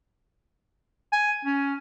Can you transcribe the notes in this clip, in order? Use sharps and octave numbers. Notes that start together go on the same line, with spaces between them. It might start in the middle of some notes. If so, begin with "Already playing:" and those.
G#5
C#4